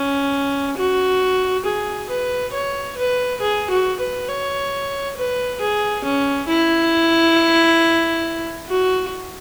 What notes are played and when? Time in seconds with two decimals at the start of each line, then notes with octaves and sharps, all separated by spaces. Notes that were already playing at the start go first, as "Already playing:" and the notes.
Already playing: C#4
0.77 F#4
1.65 G#4
2.09 B4
2.53 C#5
2.97 B4
3.41 G#4
3.70 F#4
3.99 B4
4.28 C#5
5.16 B4
5.61 G#4
6.04 C#4
6.48 E4
8.68 F#4